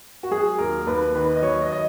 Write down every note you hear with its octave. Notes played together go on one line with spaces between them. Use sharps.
F#4
F#3 G#4
D#2 A#4
D#2 B4
D#3 B4
D#5
F#3 C#5
D#5
D#5